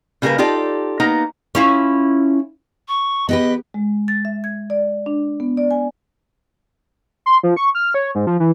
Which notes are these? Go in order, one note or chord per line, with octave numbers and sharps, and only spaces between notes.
C#3 G3 A#3 E4 A#4 B4
D#4 F4 G4 A4 D5
A#3 B3 D#4 A#5
C#4 E4 F4
C#6
B3 G4 B4 D#5
G#3
A6
E5
G#6
D5
D4
B3
D5
G#5
C6
F3
C#6
F6
C#5
G#2
F3
E3